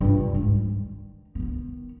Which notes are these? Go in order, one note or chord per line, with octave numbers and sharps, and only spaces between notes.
G2 F4
G#2 G#3
D#3
D#3 B3